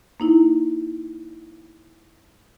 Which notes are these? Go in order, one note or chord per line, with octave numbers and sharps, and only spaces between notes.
A#3 D#4 E4